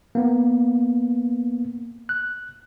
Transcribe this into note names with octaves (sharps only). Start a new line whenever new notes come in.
A#3 B3
F#6